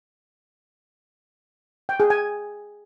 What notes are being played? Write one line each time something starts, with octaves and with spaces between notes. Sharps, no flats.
G5
G#4
G#5